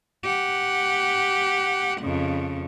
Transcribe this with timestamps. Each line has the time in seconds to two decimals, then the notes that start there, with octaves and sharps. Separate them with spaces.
0.24 G4 F#5
2.01 F2 C#3